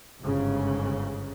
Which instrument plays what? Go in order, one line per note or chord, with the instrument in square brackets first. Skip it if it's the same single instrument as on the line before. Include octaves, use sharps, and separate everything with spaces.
[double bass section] G1 G#2 C#3